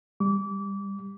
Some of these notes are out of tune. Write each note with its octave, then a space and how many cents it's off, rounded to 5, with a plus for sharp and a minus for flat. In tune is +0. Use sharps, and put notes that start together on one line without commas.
G3 +20 D6 -25